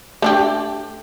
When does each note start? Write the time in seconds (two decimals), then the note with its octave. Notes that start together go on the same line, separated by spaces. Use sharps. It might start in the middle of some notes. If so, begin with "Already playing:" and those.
0.22 A3 D4 G4